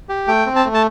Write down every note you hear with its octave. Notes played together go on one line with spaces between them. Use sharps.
G4
A3 G5
C4
A5
A3
A5